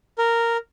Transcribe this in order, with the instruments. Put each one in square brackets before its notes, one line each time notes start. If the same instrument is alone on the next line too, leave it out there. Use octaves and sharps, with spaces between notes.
[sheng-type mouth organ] A#4